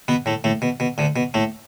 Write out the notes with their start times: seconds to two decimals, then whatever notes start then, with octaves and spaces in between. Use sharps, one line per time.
0.08 B2 B3
0.26 A2 A3
0.44 A2 A3
0.62 B2
0.80 B2
0.98 D2 D3
1.16 B2
1.34 A2 A3